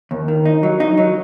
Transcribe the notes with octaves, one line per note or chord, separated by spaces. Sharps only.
D#2
D#3
D#4
F#3
D#4
F#3